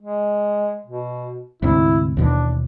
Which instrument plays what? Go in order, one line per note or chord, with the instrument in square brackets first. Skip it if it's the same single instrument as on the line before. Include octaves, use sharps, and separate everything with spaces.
[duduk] G#3
B2
[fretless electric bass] D2 G#2 C3 [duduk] E4
[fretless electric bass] D#2 B2 E3 [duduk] D4